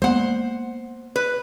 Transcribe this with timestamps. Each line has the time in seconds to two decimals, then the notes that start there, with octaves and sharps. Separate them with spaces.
0.02 G#3 A#3 B3 C5 F#5
1.16 B4